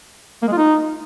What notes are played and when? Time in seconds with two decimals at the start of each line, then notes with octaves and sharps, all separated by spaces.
0.42 A#3
0.47 G#3
0.52 F4
0.57 D#4